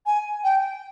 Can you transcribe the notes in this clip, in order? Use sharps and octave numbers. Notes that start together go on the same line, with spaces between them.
G#5
G5